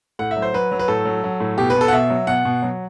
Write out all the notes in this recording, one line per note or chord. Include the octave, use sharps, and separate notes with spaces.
A2 F#5
E5
F#3
C5
F#3 B4
F#3
B4
A2 A4
F#3
F#3
A2
B2 G4
B4
B2
A4
F#5
B2 E5
F#3
B2 F#5
B2
F#3